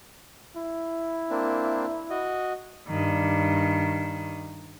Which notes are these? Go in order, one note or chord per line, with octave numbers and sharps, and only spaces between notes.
E4
A#3 C4 D4
F#4 D#5
G2 D#3